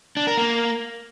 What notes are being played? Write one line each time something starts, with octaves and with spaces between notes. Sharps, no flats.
D4
A#4
A#3